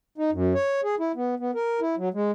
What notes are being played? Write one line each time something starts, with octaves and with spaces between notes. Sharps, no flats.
D#4
F#2
C#5
G#4
E4
B3
B3
A#4
E4
F#3
G#3